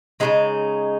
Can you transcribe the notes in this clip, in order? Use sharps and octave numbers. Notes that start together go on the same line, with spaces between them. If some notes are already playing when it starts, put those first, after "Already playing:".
C#3 F3 G#3 D#4